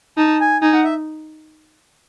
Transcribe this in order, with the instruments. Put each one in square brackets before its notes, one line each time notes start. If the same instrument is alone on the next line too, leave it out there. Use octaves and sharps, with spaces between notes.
[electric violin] D#4 [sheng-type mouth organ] A5
[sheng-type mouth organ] G#5
[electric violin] D#4 [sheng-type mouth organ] G#5
[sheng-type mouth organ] F#5
E5